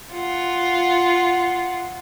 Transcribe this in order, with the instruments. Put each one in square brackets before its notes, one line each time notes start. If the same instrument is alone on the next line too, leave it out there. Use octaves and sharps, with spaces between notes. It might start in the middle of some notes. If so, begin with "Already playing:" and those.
[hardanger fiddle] F4 F#5